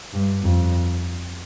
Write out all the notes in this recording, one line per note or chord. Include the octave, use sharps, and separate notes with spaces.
G2
F2